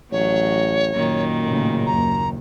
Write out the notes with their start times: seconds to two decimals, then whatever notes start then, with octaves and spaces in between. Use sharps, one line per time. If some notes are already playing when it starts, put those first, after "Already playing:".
0.12 A1 F#3 C#5
0.95 F#2 A#2 D#3
1.43 A2 C#3
1.87 F#1 D#2 A#5